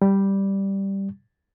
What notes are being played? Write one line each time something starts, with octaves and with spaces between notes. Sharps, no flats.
G3